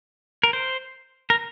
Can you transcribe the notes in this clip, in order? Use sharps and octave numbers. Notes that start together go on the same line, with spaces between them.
A#4
C5
A#4